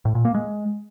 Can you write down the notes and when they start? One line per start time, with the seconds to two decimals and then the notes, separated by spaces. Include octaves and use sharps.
0.05 A2
0.15 A#2
0.25 A#3
0.34 G#3